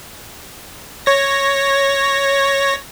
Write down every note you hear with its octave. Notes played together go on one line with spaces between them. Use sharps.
C#5 A#6